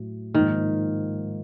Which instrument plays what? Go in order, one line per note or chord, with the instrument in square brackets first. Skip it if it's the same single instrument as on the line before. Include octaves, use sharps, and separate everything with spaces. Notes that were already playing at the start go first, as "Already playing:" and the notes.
Already playing: [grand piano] A2 F#3
[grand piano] G#2 F3 A#3 [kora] D#3